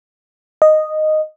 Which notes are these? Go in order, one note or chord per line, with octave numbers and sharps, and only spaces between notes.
D#5